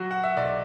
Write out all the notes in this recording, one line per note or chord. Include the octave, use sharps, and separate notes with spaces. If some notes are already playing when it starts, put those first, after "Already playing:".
Already playing: F#3 F#4
F#5
E5
B1 D5